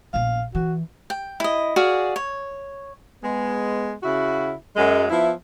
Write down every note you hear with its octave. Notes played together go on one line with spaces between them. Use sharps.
A#1 B3 F5
E3 F#4
G5
E4 D#5
F#4 G#4 D5 F5
C#5
G#3 B3
C#3 E4 F#4
F#2 G#3
F3 B3 E4